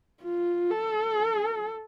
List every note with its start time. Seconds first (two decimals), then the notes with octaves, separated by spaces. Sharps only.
0.23 F4
0.70 A4